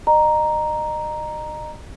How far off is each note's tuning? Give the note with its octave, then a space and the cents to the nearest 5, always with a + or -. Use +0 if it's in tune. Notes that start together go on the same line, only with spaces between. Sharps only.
D#5 -35 A#5 +0